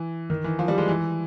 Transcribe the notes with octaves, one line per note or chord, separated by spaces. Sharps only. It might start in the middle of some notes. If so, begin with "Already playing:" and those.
Already playing: E3
D#3
E3
F3
G3
G#3
E3